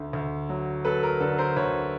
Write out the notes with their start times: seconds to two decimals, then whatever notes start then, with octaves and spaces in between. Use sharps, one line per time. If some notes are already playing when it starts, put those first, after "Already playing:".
Already playing: D2 D3
0.13 D2
0.49 F#3
0.85 F#3 A4 B4
1.03 A#4
1.20 D3 A4 B4
1.38 A#4 C5
1.56 D2 B4 C#5